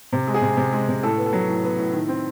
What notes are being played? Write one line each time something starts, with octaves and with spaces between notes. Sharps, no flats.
C3
G#3
G#4
C3
C3
G#3
C3
A2 A4
B3
A4
F#3
A2
B3
A2
D#3
C4